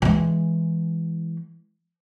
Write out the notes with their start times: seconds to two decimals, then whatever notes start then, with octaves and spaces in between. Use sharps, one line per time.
0.02 E3 G#3